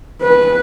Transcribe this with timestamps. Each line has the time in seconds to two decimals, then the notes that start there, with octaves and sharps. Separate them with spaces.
0.22 B4